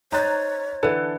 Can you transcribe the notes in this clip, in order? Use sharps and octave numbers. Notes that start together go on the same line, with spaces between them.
D#4 C5 C#5 A#5 F#6 A6
D3 E3 A4 B4